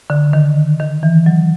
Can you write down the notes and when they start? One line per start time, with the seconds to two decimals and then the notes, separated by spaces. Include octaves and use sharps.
0.10 D3
0.33 D#3
0.80 D#3
1.03 E3
1.26 F#3